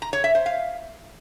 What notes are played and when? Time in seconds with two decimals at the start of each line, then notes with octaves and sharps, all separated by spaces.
0.02 A#5
0.13 C#5
0.24 E5
0.35 C5
0.46 F5